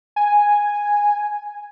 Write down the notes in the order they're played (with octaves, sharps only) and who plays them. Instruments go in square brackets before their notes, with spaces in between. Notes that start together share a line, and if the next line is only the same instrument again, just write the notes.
[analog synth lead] G#5